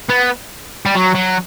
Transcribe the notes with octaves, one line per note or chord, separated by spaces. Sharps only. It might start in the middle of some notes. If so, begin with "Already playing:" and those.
B3
G3
F#3
F#3